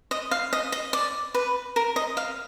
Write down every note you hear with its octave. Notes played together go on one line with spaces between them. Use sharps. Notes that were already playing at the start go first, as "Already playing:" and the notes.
D#5
F5
D#5
D#5
D5
B4
A#4
D#5
F5